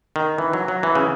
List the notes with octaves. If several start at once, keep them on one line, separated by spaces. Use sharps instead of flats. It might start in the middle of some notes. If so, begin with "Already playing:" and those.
D#3
E3
F#3
F#3
E3
C#3